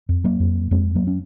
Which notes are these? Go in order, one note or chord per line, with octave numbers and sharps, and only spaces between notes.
F2
F#3 A#3
F2
F2 G#3 C4
F#3 A#3
C#4